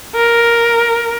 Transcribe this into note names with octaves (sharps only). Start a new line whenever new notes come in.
A#4